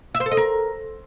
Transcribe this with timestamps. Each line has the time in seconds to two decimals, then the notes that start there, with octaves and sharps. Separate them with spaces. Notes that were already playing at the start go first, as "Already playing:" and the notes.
0.15 E5
0.20 C5
0.26 A4
0.31 D#5
0.37 A#4